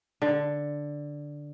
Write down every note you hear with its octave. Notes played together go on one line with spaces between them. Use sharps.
D3